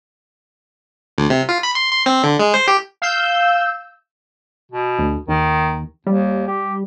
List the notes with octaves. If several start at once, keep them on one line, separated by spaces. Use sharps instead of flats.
D2
C3
F4
B5
C6
C6
C4
D3
G#3
C5
G4
F5 E6 G6
B2
D2
D#2 D#3
D#2 G3
G4